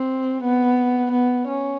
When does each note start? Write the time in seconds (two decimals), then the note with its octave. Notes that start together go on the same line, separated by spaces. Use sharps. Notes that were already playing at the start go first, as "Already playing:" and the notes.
Already playing: C4
0.43 B3
1.12 B3
1.48 C#4